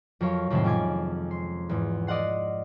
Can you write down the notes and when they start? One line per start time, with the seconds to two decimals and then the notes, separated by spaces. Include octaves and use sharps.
0.21 F2 F#3 A#4 C#5 F5
0.50 F2 A2 C3 D#3 G#3 C4
0.64 C#4 F4 G#5 D6 G#6
1.31 C6
1.69 E2 G#2
2.07 D5 D#5 F5 F#5 C6